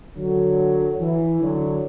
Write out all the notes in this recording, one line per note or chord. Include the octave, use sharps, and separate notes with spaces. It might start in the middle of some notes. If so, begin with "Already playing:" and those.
D3 F#3
E3
D3 F#3